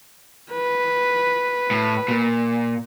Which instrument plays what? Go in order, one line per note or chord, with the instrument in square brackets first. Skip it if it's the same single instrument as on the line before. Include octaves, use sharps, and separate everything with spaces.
[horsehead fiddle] B4
[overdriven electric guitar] A2
A#2